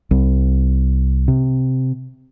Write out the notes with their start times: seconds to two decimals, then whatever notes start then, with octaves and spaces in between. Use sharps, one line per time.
0.11 C2
1.28 C3